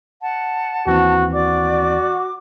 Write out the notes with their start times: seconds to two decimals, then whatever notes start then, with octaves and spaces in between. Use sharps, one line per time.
0.22 F#5 A5
0.87 D#2 E3 C4 F#4
1.33 F#4 D5 D6